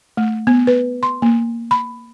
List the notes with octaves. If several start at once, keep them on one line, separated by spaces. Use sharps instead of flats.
A3
B3
B4
C6
A#3
B5